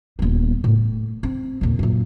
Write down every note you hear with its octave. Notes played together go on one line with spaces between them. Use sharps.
D#1 B3
A2
C4
D#2 A#2
F#2 A#2